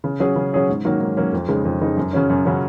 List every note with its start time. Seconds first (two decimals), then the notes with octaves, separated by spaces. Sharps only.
0.04 C#3
0.20 F#3 C#4 G#4 C#5
0.36 C#3
0.53 F#3 C#4 G#4 C#5
0.69 G#2
0.85 D#3 F#3 A#3 C#4
1.00 G#2
1.17 D#3 F#3 A#3 C#4
1.33 F2
1.49 C#3 G#3 D#4
1.65 F2
1.81 C#3 G#3 D#4
1.97 F#2
2.13 C#3 F#3 C#4
2.30 F#2
2.46 C#3 F#3 C#4